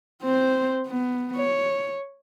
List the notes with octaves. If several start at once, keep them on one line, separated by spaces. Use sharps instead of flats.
C4 C5
B3
C#5